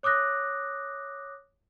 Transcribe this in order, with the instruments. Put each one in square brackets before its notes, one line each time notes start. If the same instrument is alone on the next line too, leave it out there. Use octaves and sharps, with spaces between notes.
[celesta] C#5 D6 D#6 F#6 A#6